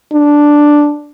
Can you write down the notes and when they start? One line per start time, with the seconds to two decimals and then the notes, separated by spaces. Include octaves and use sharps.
0.12 D4